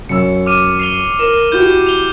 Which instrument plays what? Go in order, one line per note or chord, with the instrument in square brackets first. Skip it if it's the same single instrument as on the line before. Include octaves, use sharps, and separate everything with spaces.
[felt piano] F#2 E6 [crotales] C#7
[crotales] D6 F6 D#7
C7 F7 G7
[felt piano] A#4 [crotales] E7
[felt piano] E4 F#4 G4 [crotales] G6 G7
[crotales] F7 G7